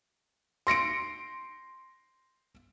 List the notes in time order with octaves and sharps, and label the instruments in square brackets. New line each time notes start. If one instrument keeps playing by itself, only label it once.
[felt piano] C6 A#6 C#7 D7